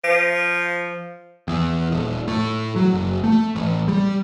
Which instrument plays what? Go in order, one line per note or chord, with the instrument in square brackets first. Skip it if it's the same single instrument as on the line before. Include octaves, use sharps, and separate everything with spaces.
[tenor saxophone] F3
[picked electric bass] E2
D#1
A2
F#3
F#1
A3
A1
G3